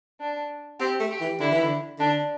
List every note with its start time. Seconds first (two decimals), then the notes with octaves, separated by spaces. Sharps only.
0.20 D4
0.80 C4 G4
1.00 A3
1.11 G4
1.21 E3
1.40 D3 E4
1.51 E3
1.63 D3
1.99 D3 D4